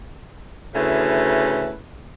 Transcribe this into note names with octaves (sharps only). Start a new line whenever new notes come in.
D2 C#3 A3 E4 B4